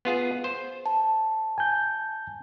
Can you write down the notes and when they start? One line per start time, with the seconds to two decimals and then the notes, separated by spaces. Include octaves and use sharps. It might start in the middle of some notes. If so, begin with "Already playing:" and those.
0.05 B3 F4 G#4
0.44 C5
0.86 A5
1.58 G#5 G6